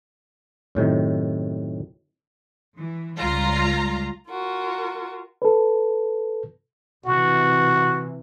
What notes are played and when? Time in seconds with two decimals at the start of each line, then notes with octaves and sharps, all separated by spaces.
0.75 F#2 A2 C3 D#3
2.77 E3
3.17 C#2 G3 F4 A#5
4.29 F4 F#4 A#4
5.42 A4 B4
7.05 C3 E3 F#4